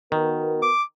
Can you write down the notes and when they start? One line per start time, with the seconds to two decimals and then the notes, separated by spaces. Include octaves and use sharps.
0.12 D#3 B3 F#4 A#4
0.62 D6